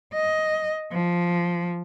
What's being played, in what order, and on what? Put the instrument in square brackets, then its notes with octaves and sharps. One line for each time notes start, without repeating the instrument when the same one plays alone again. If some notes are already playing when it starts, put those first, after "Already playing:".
[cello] D#5
F3